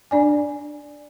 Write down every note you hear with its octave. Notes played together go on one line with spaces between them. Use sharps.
D4 D5 G#5